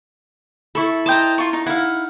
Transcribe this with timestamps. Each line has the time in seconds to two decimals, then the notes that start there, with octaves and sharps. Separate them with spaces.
0.75 E4 A4 B5 C#6
1.06 C5 D#5 G5 A5 A#5
1.38 F4 C#6
1.53 D#4
1.66 D#4 E4 F5 F#5